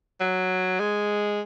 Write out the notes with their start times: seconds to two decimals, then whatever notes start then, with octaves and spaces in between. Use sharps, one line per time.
0.20 F#3
0.80 G#3